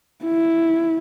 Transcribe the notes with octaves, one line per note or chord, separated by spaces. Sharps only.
E4